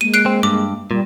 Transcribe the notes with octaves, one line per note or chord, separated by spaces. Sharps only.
G#3 A#3 D#7
F#6 C7 D7
C4
G2 D6
A#2 G3